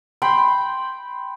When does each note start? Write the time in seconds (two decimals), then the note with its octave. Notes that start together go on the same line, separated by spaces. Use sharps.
0.22 G5 B5 C6